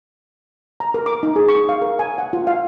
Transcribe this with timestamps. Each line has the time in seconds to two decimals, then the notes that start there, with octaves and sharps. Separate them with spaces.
0.80 A#5
0.94 A#4
1.06 D6
1.23 D#4
1.36 G#4
1.48 C#6
1.69 F5
1.82 A#4
1.99 G#5
2.18 F#5
2.33 F4
2.47 F5